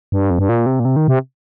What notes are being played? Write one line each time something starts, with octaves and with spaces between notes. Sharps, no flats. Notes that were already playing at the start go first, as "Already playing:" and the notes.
G2
F2
G2
A#2
C3
A#2
C3
D#3
C3